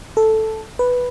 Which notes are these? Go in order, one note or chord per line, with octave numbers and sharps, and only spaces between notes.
A4
B4